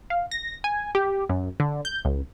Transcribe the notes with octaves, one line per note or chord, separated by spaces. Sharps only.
F5
A#6
G#5
G4
F#2
D3
G6
C#2